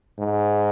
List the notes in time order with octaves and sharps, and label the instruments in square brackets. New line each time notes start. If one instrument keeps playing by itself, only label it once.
[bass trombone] G#2